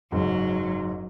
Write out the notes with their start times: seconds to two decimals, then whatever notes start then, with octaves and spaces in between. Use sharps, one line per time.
0.12 F#1 G#2 F#3